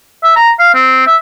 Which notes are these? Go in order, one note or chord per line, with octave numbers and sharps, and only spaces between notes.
E5
A#5
F5
C4
E5